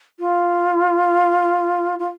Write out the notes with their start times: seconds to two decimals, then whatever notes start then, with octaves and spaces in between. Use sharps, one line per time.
0.20 F4
1.99 F4